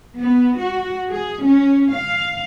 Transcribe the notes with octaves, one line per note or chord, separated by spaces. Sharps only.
B3
F#4
G#4
C#4
F5